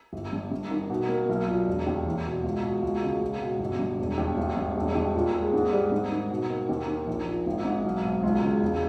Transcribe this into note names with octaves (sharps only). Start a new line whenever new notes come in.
G1
G2
G2
D#3
B2
A#3
B1
A#2
E1
D#2
E2
B2
C#2
B2
C#2
C#3
C#2
B2
G1
G2
E1
D#2
G#1
G2
E1
D#2
A#2
G#3
G#2
G3
G#2
D#3
B2
A#3
D#2
D#3
A#1
A#2
G#1
G#2
B1
B2
C#2
C#3
E1